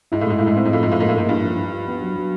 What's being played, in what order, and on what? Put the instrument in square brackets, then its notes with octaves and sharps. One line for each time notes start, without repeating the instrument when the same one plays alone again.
[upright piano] G#2 [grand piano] E4
[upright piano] A2
[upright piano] G#2 [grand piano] G#3
[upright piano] A2 [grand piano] E4
[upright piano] G#2
[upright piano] A2 [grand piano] C4
[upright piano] G#2
[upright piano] A2 [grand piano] F3
[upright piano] G#2 [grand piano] F3
[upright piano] A2
[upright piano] G#2 [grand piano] A#3
[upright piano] A2
[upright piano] G#2 [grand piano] A#3
[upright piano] G2 [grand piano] E4
[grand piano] F3
E4
F3
B3
F#3
F#3